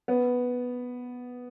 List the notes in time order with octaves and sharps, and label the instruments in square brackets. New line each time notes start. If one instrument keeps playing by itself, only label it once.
[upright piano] B3